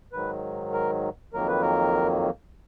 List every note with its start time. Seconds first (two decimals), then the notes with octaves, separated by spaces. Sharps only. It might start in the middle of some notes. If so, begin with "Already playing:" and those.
0.13 G#2 D#3 F#3 B4
0.73 A#4
1.33 F2 D#3 F#3 A#3 A#4
1.48 B4
1.62 A#4